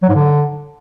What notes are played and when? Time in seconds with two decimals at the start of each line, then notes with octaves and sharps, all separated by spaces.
0.03 F#3
0.09 G#2
0.15 D3